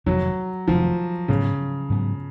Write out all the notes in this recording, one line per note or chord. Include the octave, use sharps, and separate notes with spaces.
F1 F2 D#3 F#3
F1 F2 D#3 F3
G#2 C#3 F#3 B3
G#2 F#3 B3